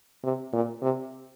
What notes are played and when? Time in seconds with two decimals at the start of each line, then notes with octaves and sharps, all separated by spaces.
0.23 C3
0.53 A#2
0.82 C3